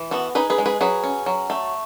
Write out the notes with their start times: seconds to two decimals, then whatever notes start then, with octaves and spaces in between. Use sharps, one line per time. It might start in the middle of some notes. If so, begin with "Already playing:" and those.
Already playing: E3
0.11 B3 F#4 A4
0.35 D#4 G#4 B4
0.50 G#4 B4
0.58 G#3
0.66 G#4 B4
0.81 F#3 G#4 B4
1.04 C#4
1.26 F#3
1.50 A3